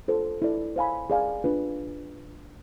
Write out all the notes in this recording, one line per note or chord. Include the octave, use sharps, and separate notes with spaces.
F4 A4 C5
E4 A4 D5
C5 F5 G#5 B5
G#4 D5 F5 G#5
D4 F4 B4